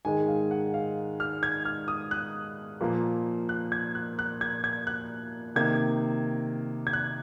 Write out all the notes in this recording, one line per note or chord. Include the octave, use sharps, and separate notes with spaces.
G#2 D#3 G#3 G#5
F5
F#5
F5
F6
G#6
F6
D#6
F#6
A#2 F3 A#3
F#6
G#6
F#6
F#6
G#6
G#6
F#6
C3 D#3 A#3 G#6
G#6
F#6